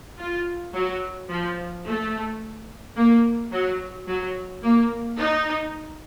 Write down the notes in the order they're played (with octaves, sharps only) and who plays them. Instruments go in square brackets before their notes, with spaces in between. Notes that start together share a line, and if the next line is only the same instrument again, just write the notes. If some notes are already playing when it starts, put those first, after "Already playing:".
[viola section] F4
F#3
F3
A3
A#3
F#3
F#3
A#3
D#4